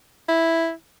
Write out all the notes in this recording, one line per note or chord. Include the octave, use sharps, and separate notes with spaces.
E4